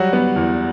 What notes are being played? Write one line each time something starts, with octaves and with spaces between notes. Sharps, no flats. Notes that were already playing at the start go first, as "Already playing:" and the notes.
Already playing: F#3 G3 F#4
B3
E2